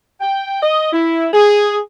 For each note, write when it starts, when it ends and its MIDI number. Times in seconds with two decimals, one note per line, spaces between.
0.20 0.61 79
0.62 0.89 75
0.92 1.28 64
1.33 1.79 68